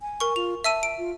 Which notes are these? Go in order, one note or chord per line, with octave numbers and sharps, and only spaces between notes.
G#5
A#4 C#6
F4 F7
E5 A5 E6 D#7
D7
F4